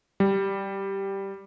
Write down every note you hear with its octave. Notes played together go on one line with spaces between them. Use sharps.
G3